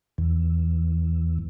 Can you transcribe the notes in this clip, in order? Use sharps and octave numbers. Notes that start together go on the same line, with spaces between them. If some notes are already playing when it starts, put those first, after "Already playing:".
E2